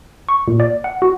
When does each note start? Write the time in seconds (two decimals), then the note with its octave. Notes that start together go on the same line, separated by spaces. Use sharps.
0.29 C#6
0.48 A#2
0.60 D5
0.84 F#5
1.02 F#4